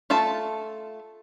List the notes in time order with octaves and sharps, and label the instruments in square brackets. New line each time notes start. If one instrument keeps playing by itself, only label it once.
[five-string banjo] A3 F4 A4 A5